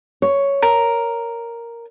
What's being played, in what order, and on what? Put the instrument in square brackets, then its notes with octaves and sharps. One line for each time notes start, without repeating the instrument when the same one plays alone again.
[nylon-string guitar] C#5
[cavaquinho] A#4